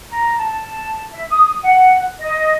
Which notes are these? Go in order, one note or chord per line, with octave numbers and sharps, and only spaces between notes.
A#5
A5
E5
D#6
F#5
D#5